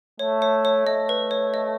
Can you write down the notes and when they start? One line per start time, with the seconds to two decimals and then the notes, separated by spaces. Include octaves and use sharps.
0.19 A3 C#5
0.42 C#5
0.65 C#5
0.87 A3 D#5
1.09 B4
1.31 C#5
1.54 D#5